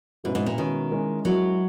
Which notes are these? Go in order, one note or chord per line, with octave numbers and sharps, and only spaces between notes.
G#2 B2 G#3 C#4 E4 B4
G#2
A#2
B2 D#3 G#3 C#4 E4 B4
G#3 C#4 E4 A#4
F#3 G#3 C#4 E4 A#4